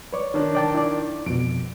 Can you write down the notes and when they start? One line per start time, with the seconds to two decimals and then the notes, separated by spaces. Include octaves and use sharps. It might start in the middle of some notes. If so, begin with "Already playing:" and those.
0.13 B4 C#5 D5
0.34 D#3 D4
0.55 D5 G5 A5
0.74 E4 D5
1.26 F2 B2 D7